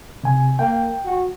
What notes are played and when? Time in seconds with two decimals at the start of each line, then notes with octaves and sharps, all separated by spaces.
0.23 C3 G#5
0.59 A#3 G5
1.05 F#4